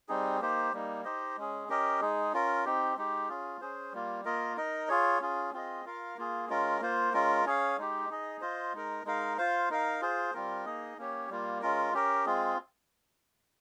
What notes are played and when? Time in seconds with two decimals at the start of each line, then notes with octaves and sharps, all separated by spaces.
0.09 G3 C4 D#4 G#4
0.40 A#3 D#4 G4 C5
0.73 G3 A#3 D#4
1.04 D#4 G4 C5 D#5
1.37 G#3 C#4 G#4
1.69 C#4 G4 A#4 D#5
2.00 G#3 D#4 G#4
2.33 C#4 F4 A#4
2.65 C4 D#4 G4
2.97 G#3 D#4 G4
3.29 C#4 F4 G#4
3.61 C#4 G#4 C5
3.93 G3 A#3 F4
4.25 A#3 F4 A#4 D#5
4.57 D#4 A#4 D#5
4.88 F4 G#4 C#5
5.21 C#4 F4 G#4
5.53 C4 F4 G#4 D#5
5.85 F4 A#4 F5
6.17 A#3 F4 G#4
6.49 G#3 C#4 F4 A#4
6.81 A#3 F4 C5
7.13 G#3 C#4 F4 A#4
7.45 C#4 G#4 C#5 F5
7.77 G#3 D#4 G4
8.09 D#4 G#4 D#5
8.41 F4 C5 D#5
8.73 G#3 D#4 A#4
9.05 G#3 D#4 A#4 F5
9.38 F4 C5 F5
9.70 D#4 A#4 F5
10.01 F4 G#4 C5
10.34 G3 C4 F4 A#4
10.65 A#3 D#4 G#4 D#5
10.98 A#3 C#4 G4 C#5
11.30 G3 A#3 F4
11.62 G#3 C#4 F4 A#4
11.94 C#4 G4 A#4
12.25 G#3 C4 F4 G#4